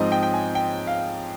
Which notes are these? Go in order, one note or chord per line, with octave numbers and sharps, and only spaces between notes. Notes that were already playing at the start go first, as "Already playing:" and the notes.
Already playing: G#2 F3 C4 D#4 D#5
G5
G5
G#5
G5
F5